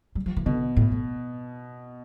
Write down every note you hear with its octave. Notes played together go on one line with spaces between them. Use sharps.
G3
F3
E3
B2 D3
A2
A2